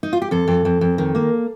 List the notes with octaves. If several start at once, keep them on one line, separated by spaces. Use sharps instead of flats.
D#4
F4
G4
F2 A4
F2
F2
F2
D#3
A#3